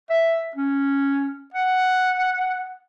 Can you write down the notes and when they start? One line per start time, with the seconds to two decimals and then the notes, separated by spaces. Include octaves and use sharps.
0.10 E5
0.55 C#4
1.54 F#5